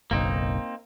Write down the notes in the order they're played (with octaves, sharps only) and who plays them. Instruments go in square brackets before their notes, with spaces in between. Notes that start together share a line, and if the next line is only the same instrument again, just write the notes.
[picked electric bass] F#1 B1 [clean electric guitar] A#3 C4 D#4